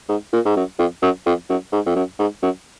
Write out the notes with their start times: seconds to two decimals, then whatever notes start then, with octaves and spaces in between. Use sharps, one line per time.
0.09 G#2
0.33 A#2
0.45 G#2
0.56 F#2
0.79 F2
1.02 F#2
1.26 F2
1.49 F#2
1.72 G#2
1.86 F2
1.96 F#2
2.19 G#2
2.42 F#2